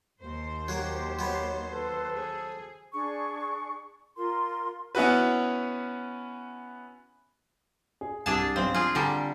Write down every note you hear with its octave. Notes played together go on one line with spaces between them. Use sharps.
D#2 C5
F#3 A#3 G4
F#3 B3 C#5
A4 B4
G#4 C5
D4 G#4 C#6
F4 A#4 C6
B3 C#4 E4 F#4 B4
G#4
C2 D4 G#4 A5 E6
B1 C4 C5 F5
F4 G#4
D3 G3 G#5 A#5